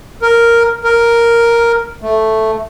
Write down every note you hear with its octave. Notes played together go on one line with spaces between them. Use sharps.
A#4
A#4
A3